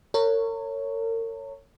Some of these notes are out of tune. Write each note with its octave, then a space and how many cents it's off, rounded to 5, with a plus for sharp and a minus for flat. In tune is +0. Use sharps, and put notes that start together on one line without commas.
A#4 -40 C#5 +0